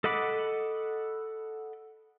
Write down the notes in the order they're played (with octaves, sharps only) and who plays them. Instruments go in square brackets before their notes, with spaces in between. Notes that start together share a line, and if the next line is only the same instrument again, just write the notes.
[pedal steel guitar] A4 D#5 F#5 B5 D6